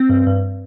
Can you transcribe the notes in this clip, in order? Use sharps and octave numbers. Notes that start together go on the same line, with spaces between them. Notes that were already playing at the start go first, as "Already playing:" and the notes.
Already playing: C4
G2
G2